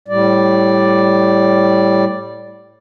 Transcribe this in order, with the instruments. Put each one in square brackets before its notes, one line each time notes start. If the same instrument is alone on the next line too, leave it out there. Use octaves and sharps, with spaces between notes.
[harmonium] A2 G3 D5